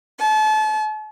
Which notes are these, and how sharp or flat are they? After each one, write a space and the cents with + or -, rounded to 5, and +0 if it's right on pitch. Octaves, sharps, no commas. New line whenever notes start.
A5 -35